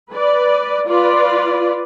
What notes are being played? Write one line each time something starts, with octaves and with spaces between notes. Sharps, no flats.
B4 D5
F4 B4 D5